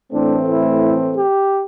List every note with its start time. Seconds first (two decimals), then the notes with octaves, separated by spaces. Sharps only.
0.12 A2 E3 A3 C4 D4
0.47 E4
1.17 G4